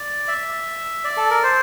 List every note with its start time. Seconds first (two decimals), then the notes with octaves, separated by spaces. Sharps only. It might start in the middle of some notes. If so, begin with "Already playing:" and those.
Already playing: D5
0.28 E5
1.04 D5
1.17 A4
1.30 A#4
1.43 C5